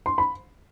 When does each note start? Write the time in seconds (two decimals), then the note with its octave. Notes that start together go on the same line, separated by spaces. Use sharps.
0.06 C6
0.18 B5